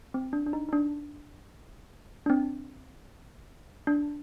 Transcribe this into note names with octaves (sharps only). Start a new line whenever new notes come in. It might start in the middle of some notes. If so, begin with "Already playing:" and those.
C4
D4
D4
D#4
D#4
D4
D4
C4
D4